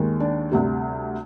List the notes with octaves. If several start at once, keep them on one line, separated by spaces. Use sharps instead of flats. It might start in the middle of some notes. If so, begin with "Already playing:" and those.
Already playing: D#2 D#3 G#3
D4
D2 C3 G3